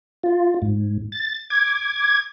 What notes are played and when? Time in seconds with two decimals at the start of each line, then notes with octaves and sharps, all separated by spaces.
0.24 F4
0.62 G#2
1.12 A6
1.50 D6 G#6